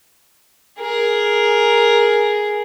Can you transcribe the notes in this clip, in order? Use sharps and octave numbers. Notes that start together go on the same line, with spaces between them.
G#4 A#4